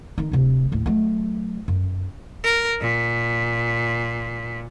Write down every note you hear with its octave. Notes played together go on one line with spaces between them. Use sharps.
D#3 D#4
D1 C3
D#2 A2
F#3 A3
F#2
A#4
A#2